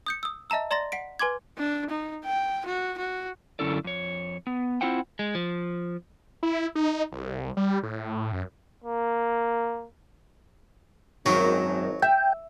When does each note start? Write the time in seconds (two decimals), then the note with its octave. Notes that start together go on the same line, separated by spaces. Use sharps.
0.06 D#6 G6 C#7
0.23 D#6 E6
0.50 D#5 E5 A5 A#5 E6
0.71 D5 A#5 C6 A6 A#6
0.92 F#5 B6 D7
1.19 B4 G#5 C6 D6 G#6
1.58 D4
1.90 D#4
2.25 G5
2.66 F#4
2.98 F#4
3.59 F#2 D3 C#4 E4 A4 D5
3.84 F2 C#5
4.47 B3
4.81 C4 E4 F4 C5 F#5 G5
5.19 G#3
5.35 F3
6.43 E4
6.75 D#4
7.12 C2
7.57 G3
7.83 A2
8.32 F#2
8.85 A#3
11.26 G#1 F#2 D#3 F#3
12.02 E5 G5